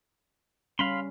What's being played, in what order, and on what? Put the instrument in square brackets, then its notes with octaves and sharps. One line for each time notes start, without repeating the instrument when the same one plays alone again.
[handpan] G3 C#4 [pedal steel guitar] F5 B5 C6